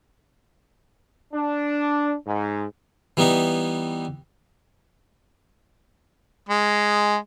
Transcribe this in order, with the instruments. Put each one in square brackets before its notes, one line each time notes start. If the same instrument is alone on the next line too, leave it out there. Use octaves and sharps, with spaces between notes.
[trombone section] D4
G#2
[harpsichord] E3 G3 B3 D#4 E5
[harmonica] G#3